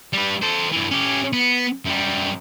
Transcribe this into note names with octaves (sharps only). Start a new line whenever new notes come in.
G3 B4
A4 C5
G2 E3
C#4 G4
B3
F#2 G3